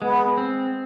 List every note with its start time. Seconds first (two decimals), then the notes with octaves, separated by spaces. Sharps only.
0.01 G#3 B3
0.37 C4